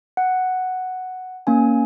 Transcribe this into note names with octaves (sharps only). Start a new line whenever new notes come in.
F#5
A#3 C#4 G#5